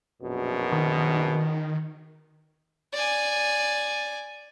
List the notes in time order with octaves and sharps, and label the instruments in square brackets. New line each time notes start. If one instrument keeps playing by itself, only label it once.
[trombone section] A#1 F#2 B2
[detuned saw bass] D#3
[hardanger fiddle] D5 G#5